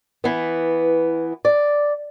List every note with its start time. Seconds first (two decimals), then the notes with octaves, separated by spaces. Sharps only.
0.24 E3 B3
1.45 D5